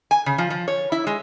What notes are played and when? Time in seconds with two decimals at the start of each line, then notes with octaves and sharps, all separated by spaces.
0.11 G#5
0.26 C#3
0.38 F3
0.50 F3
0.68 C#5
0.92 E4
1.07 G#3